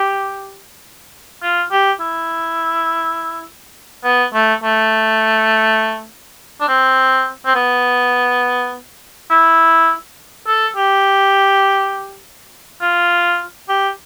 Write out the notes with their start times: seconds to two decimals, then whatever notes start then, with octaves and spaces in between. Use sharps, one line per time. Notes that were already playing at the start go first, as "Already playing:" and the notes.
Already playing: G4
1.42 F4
1.71 G4
2.00 E4
4.04 B3
4.34 A3
4.63 A3
6.61 D4
6.68 C4
7.45 C4
7.55 B3
9.31 E4
10.47 A4
10.76 G4
12.81 F4
13.69 G4